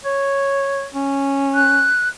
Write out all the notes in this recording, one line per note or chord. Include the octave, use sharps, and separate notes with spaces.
C#5
C#4
F#6